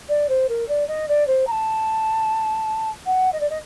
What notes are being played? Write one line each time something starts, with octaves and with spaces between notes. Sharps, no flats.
D5
C5
A#4
D5
D#5
D5
C5
A#5
A5
F#5
D#5
D5
D#5